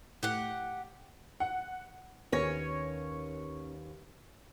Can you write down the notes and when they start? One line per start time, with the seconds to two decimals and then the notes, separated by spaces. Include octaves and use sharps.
0.23 A2 G4 F#5
1.40 F#5
2.32 D#2 C#4 B4 C#5 A#6